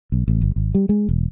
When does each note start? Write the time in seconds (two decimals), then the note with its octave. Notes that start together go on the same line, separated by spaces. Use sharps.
0.12 B1
0.28 A1
0.41 G1
0.56 G#1
0.75 G3
0.89 G#3
1.09 E1